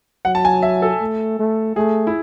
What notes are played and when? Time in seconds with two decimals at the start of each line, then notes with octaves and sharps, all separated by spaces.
0.25 F#3 F#5
0.35 A5
0.45 G#5
0.63 E5
0.82 A4
1.01 A3
1.39 A3
1.76 A3 G#4
2.07 E4